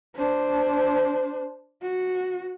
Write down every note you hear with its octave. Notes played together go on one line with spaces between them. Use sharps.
D4 C5
F#4